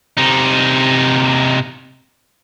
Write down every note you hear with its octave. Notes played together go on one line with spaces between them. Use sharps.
C3 D#4